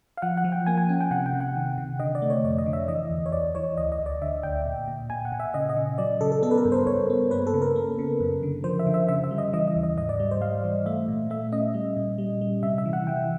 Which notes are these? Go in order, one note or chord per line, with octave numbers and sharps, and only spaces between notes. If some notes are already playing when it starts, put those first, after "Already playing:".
F5
F3 F#5
F#5
F3
G5
A#3 G#5
G#5
C#4
G5
C3 F#5
G5
C3
F#5
D#3
C3
D3 D#5
D5
A3
C#5
F2 D5
D#5
D3
E5
E3 D#5
E2
C#5
E2 D5
E3 C#5
D2 D#5
D#5
D2
D5
D3 E5
D2 G5
A#2
A#2
A#2 G#5
F#5
A#2
E5
C#3 D#5
D#5
C#3
F#3 D5
C#3 A4
A4
B3 A4
B4
A#4
G2
C5
G2 C#5
B3
A#3 B4
A4
C#3
A#4
A#3
C#3
F#2
D3
F3 C5
E5
D3
E5
C#3 E5
E5
G3
D#5
E3 D#5
D#5
D#2
D#5
G#2 D#5
D5
G3
C5
G3 F5
E3
A3 E5
A#2
A3 E5
C#4 D#5
G3
A#2
G3
G3
C3 E5
E5
E3
F#5
E3 G5